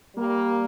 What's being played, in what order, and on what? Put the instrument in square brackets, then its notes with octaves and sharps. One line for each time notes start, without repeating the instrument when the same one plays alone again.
[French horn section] G3 A#3